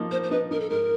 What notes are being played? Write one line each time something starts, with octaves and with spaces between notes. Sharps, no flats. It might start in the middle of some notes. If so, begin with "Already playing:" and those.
Already playing: F3 A#3 D#4
A#3 C5
C5
D#4 B4
D#4 A#4
A4
G#2 A#4